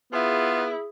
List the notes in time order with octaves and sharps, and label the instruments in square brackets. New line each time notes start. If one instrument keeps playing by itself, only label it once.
[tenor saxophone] B3 [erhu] E4 [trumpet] F4 [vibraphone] G#4 D#6